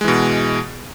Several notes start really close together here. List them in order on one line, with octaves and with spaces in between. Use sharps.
G#3 E3 B2